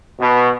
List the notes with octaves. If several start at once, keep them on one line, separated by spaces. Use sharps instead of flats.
B2